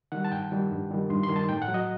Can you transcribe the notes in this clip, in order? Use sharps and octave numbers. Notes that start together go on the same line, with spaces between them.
D#3 G3 F#5
A5
G2 G5
D#3 G3
G2
D#3 G3
G2 C6
C6
D#3 G3
A5
A2 G5
F#5
F#3
D#5